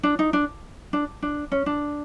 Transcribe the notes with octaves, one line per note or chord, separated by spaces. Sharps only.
D4
D#4
D4
D4
D4
C#4
D4